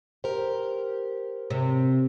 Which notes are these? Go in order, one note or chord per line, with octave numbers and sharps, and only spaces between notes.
G4 A#4 C5
C3